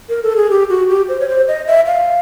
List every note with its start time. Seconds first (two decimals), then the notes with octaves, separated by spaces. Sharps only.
0.09 A#4
0.23 A4
0.36 G#4
0.50 G4
0.70 F#4
0.89 G4
1.09 C5
1.20 C#5
1.28 C5
1.48 D#5
1.67 E5
1.86 F5